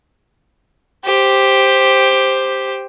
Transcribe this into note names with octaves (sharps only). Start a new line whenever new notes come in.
G4 C5